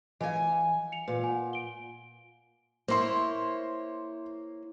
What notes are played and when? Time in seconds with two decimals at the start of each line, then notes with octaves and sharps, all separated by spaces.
0.21 E3 D#5 F5 G#5
0.92 C#7 F7
1.08 A#2 B4
1.24 F#5 G#5
1.53 D7 G7
2.88 A#3 E4 C5 C#5 C6